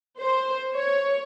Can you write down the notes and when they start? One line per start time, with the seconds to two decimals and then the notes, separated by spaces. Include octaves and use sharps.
0.19 C5
0.76 C#5